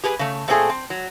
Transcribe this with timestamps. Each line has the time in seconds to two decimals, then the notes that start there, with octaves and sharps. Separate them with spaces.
0.04 G4 G#4 B4 G#5
0.19 C#3 A3
0.48 A#2 A3 C4 C#4 G#4 A4
0.69 C4
0.90 F#3